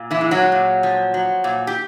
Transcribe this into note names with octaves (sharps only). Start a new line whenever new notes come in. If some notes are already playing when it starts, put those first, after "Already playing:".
Already playing: A#2
E3 E4
G#3
F#3 F#4
A#2
F3
F#3
A#2
G4